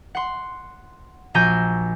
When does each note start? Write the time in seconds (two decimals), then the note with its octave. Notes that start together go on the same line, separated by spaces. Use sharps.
0.15 F#5 C6
1.34 A#1 F#4 G#5 A#5 E6 G6